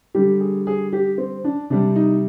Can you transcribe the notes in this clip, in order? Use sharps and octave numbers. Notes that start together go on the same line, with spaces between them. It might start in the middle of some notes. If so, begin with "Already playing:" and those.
D3 G3 G4
G#4
G#4
G4
C4
D4
C3 G3 D4
D#4